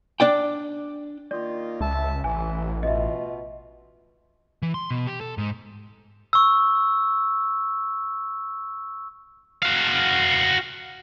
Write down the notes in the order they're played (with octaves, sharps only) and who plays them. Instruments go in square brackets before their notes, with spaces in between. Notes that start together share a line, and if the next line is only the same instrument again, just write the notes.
[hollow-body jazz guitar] D4 D5 G5
[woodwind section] D#3 A#3 F4 [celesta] D5
[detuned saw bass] C#2 [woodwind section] E5 A5
[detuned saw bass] A1 [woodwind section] E3 [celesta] G#5
[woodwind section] B2 F4 [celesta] D#5 E5
[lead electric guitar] E3
C6
B2
G4
A4
G#2
[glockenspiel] C#6 E6
[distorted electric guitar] F#4 F5